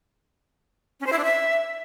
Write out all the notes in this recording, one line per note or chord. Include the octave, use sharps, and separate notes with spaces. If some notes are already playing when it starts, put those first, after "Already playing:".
C#4
C5
E4
D4
E5